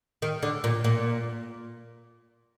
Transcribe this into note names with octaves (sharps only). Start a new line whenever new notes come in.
D#3
D3
A#2
A#2